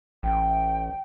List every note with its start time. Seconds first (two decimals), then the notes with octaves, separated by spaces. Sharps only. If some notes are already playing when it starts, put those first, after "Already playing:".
0.23 A1 G5